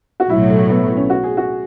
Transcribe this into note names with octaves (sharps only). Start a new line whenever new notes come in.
F#4
B1 A2 F#3 E4
A3
B3
C#4
F#4
G#4
F#4